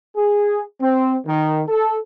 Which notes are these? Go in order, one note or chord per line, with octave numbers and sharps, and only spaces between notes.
G#4
C4
D#3
A4